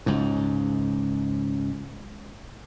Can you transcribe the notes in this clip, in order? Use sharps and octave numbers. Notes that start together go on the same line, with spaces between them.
C#2 G#2